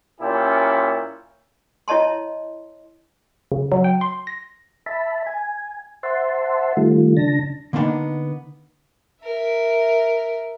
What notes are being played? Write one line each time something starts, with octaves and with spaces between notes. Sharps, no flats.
A#2 C#4 E4 G4
E4 C#5 D#5 A5 C6
C#3
F#3
G5
C6
A#6
E5 A5 B5
G#5
C5 E5 F#5 A5 C6
D#3 G3 A3 F4
C#3 D4 A5 A#6
D3 A#3 B3 D4 D#4
A#4 E5